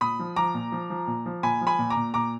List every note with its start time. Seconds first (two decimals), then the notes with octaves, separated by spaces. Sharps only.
0.01 A#2 B5 D#6
0.19 F3
0.36 F3 A#5 D6
0.54 A#2
0.72 F3
0.90 F3
1.07 A#2
1.26 F3
1.43 A#2 G#5 B5
1.61 F3
1.67 G#5 B5
1.79 A#2
1.90 A#5 D6
1.96 A#2
2.14 A#2 A#5 D6